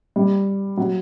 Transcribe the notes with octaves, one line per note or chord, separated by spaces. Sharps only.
G3
F#3